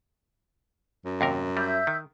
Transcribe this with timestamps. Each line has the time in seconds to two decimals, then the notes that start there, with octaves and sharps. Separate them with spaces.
1.05 F#2
1.21 D#2 C3 A#4
1.57 G3 E5 E6 G6
1.87 D#3